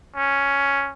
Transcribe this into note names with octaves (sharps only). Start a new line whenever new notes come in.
C#4